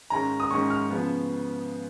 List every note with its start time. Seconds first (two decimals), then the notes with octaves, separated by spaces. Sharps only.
0.10 G#2 D#3 G#3 C#4 A#5
0.40 D#6
0.51 G#2 D#3 G#3 C#4 C#6
0.70 F6
0.90 C#3 F3 B3